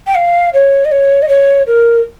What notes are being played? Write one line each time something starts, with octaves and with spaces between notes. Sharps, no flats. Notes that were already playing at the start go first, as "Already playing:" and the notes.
G5
F5
C#5
D#5
C#5
D#5
C#5
A#4